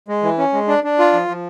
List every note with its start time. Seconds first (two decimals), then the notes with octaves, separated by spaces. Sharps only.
0.08 G#3
0.23 E3
0.38 C#4
0.53 G#3
0.68 D4
0.84 D4
0.99 F4
1.13 F3
1.28 F3